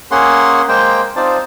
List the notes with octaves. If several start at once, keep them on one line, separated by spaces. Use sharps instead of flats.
A#3 C#4 G#4 F#5 C6
G#3 A#3 C5 G5
C4 D#4 F4 C5 D5 A5